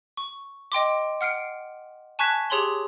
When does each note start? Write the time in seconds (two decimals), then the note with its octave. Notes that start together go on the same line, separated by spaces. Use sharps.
0.17 C#6
0.72 D#5 G5 C6 D6
1.21 F#5 F6 C7 D7
2.19 G#5 A5 C#6 F#6 G#6 B6
2.50 G4 G#4 C#5 C6 F#7 G7